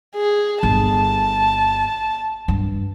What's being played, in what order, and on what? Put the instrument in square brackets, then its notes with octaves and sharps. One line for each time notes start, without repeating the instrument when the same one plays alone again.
[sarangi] G#4
[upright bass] G1 [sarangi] A5
[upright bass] G2